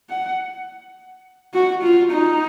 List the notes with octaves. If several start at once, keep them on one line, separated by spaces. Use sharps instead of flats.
F#5
F#4
F4
D#4